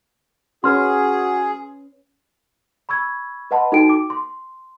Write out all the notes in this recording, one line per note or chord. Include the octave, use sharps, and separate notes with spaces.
C#4 F#4 G#4 B4 C6 F6
B5 C#6 E6 G#6
B4 D#5 F#5 A5 B5 C6
D#4 F#4 A4 G5 D7
D6
C6